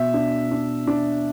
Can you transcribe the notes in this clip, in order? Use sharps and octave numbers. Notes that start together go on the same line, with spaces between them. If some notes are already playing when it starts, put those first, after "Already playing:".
Already playing: B2 E5
D4
D4
D4